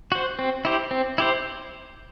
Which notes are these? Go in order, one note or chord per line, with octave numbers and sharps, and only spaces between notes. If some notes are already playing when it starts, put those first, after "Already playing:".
F#4 C5
C4
E4 G4 C5
C4
E4 G4 C5